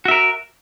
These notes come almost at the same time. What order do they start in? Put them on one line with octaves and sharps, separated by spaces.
F#4 E5 A#4